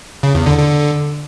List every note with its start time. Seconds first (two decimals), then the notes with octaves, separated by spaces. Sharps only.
0.23 C#3
0.35 E2
0.46 D3
0.58 D3